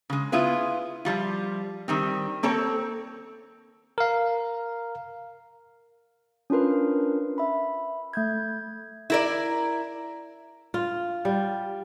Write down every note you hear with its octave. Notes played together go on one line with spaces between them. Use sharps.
C#3 G#3
B3 E4 F4 G#4 B4
F3 G3 F4
D#3 G3 C4
A#3 C4 A4 C#5
A#4 F5
C#4 D4 F4 A#4 B4
E5 B5
A3 G6 G#6
E4 A#4 D5
F4
G3